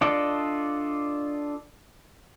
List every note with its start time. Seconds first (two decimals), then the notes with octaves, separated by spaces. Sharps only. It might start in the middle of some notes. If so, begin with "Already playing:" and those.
0.01 D4 F4 A4 D5 D#5